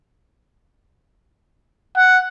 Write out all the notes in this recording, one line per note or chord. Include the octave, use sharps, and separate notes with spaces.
F#5